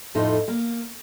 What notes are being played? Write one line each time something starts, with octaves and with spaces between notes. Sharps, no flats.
F2 A2 A3 D#4 F4
A#3